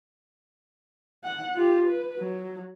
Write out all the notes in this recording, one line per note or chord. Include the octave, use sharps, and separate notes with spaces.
F#5
F4 G4
B4
F#3